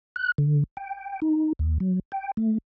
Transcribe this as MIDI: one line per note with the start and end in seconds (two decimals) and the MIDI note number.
0.16 0.32 90
0.38 0.64 50
0.77 1.20 79
1.22 1.53 63
1.59 1.78 39
1.80 1.99 54
2.12 2.31 79
2.37 2.58 57